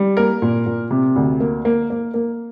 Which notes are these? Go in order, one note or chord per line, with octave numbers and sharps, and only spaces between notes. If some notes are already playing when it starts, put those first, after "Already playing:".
Already playing: G3
A#3 A#4
A#2
A#2
C3
D2
A#3
A#3
A#3
A#3